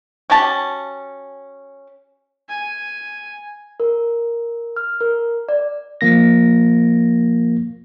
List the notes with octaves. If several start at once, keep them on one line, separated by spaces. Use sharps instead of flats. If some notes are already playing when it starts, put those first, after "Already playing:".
C#4 F#4 G4 A5
G#5
A#4
F6
A#4
D5
F3 A#3 A#6